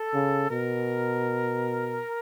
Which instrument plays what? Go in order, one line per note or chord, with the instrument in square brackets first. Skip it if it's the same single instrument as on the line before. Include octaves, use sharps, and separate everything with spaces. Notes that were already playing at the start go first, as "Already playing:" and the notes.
Already playing: [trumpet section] A4
[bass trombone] C#3
[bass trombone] B2 [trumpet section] A#4